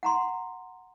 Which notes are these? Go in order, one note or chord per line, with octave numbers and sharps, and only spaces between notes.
F#5 A#5 C6